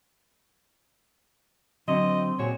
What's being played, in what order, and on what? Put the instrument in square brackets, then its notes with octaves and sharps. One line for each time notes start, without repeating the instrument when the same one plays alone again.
[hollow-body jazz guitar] D3 F#3 [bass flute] C4 [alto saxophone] D#5 [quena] C6
[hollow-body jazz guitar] A#2 F#4 G#4 [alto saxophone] C#5